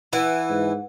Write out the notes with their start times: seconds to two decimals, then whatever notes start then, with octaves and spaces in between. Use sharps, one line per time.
0.13 E3 E4 B4 F#5
0.50 G#2